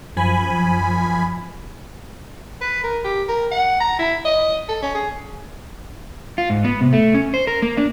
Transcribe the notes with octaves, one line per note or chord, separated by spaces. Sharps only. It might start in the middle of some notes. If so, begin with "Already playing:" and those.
F#2 F3 G#5 B5
B4
A#4
G4
A#4
F#5
A#5
E4
D#5
A4
C#4
G#4
F4
G#2
B3
C3
A3
C#4
C5
A#4
A#3
D4